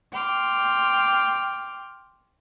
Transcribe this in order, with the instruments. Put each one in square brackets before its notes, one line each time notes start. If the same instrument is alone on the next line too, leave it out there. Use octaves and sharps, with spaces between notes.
[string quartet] G5 C6 D6 F6